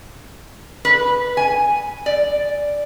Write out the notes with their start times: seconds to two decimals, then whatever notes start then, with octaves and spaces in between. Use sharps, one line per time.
0.85 B4
1.37 G#5
2.06 D5